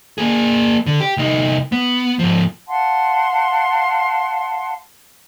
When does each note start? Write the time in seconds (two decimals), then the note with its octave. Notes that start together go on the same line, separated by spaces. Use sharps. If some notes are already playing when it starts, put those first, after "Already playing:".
0.18 A#3 G#4
0.86 D3
1.00 G4
1.17 C2 D#4
1.72 B3
2.19 G#2 F3
2.68 F5 F#5 A5 C6